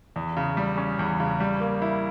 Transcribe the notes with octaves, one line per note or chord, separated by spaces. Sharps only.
E2
C#3
G3
C#4
E2
C#3
G3
A#3
E4